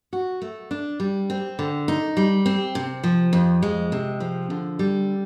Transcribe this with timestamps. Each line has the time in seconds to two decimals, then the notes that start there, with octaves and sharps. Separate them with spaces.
0.13 F#4
0.42 A3
0.71 D4
1.00 G3
1.30 C4
1.59 D3
1.88 D#4
2.17 G3
2.46 C4
2.75 C3
3.04 F3
3.33 F2
3.63 G#3
3.92 C3
4.20 F3
4.50 D3
4.79 G3